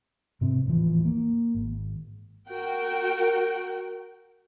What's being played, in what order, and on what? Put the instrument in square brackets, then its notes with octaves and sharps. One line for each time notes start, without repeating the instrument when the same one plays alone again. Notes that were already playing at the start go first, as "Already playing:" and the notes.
[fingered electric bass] G#2 C3 C4
A1 D#2 E3 F3
A#3
G#1
[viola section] F#4 A#4 G5